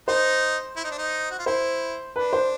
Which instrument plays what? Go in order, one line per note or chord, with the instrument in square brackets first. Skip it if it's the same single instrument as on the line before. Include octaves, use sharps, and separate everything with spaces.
[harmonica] D#4 [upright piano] C5
[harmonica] E4
D#4
D4
D#4
F#4
F4
[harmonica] E4 [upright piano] C5
[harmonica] D4 [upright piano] B4
[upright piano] C5